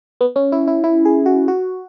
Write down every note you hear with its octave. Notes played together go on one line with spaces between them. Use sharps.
B3
C#4
E4
E4
E4
G#4
F#4
F#4